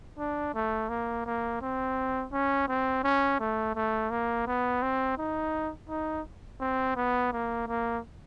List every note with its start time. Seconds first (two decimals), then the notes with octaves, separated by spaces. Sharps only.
0.19 D4
0.55 A3
0.89 A#3
1.26 A#3
1.62 C4
2.33 C#4
2.69 C4
3.04 C#4
3.40 A3
3.75 A3
4.11 A#3
4.47 B3
4.82 C4
5.18 D#4
5.89 D#4
6.61 C4
6.96 B3
7.33 A#3
7.68 A#3